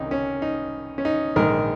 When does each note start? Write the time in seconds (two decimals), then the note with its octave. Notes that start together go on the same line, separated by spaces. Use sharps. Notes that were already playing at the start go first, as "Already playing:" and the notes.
Already playing: C2 C3 D#3 C#4 D#4
0.11 C#4
0.42 D#4
0.98 C#4
1.05 D#4
1.36 A#1 G#2 D#3 A#4